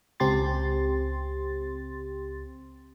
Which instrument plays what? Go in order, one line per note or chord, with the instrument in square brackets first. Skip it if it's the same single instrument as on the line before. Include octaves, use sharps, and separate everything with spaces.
[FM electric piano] C#2 C4 G4 C6 A6